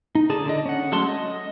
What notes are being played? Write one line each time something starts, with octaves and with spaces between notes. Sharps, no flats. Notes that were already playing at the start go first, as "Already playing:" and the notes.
D#4
D3 G#4 A5
D3 D4 D#5
C#4 F#5
F#3 G#3 A3 A5 C6
D#5